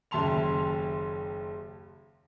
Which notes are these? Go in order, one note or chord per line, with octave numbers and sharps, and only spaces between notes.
F#1 D#2 E5 A5 C6 F7